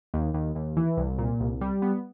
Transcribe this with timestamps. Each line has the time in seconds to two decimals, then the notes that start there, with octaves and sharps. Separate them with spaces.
0.14 D#2
0.34 D#2
0.55 D#2
0.77 E3
0.97 C2
1.18 A#2
1.40 C2
1.61 G3
1.82 B3